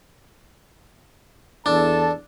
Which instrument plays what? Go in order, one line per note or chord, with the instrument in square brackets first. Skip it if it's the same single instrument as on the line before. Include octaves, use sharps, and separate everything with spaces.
[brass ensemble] E2 A4 A5 [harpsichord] D4